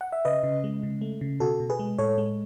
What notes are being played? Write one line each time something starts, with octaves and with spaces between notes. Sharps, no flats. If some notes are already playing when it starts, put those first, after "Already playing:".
F#5
E5
C#3 B4 D#5
C#3
G#3
C#3
A3
C#3
B2 F#4 A4
B2
G#4 B4
G#3
A2 A4 C#5
G#3